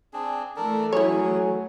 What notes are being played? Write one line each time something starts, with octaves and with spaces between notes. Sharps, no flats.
C4 D4 G#4
E3 A3 D4 A4 A#4
F#3 C#4 E4 G#4 C#5